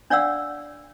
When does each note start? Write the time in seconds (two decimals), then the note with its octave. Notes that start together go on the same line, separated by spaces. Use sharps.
0.10 D4 C#5 D5 F5 F#5 E6